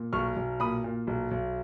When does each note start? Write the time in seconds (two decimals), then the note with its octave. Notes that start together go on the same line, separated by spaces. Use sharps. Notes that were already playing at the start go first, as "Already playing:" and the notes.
Already playing: A#2
0.13 B1 C#6 F6
0.36 B1
0.60 A#2 B5 D#6
0.84 A#2
1.07 B1
1.31 B1